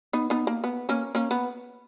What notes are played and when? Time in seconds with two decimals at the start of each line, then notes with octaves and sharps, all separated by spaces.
0.13 B3 D#4
0.30 B3 D#4
0.47 A#3
0.64 B3
0.89 A#3 C#4
1.15 A#3 C#4
1.31 B3